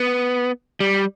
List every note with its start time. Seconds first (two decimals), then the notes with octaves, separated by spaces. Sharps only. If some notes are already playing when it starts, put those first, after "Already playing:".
Already playing: B3
0.80 G3